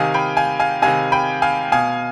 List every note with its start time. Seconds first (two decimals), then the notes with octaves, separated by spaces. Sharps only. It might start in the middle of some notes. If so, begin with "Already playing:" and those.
Already playing: C3 D#3 F5 G#5
0.14 G5 B5
0.37 F5 G#5
0.60 F5 G#5
0.82 C3 D#3 F5 G#5
1.12 G5 B5
1.42 F5 G#5
1.72 B2 F5 G#5